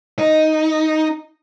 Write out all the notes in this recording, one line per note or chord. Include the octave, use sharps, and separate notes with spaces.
D#4